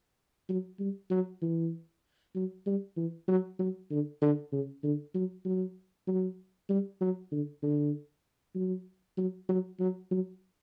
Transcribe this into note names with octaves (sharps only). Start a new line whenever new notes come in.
F#3
G3
F#3
E3
F#3
G3
E3
F#3
F#3
D3
D3
C#3
D3
F#3
F#3
F#3
G3
F#3
D3
D3
F#3
F#3
F#3
F#3
F#3